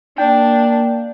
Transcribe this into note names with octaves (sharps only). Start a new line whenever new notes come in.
A#3 D4 G5